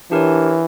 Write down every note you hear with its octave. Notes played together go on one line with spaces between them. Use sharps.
E3 D4 G4 A#4 C#5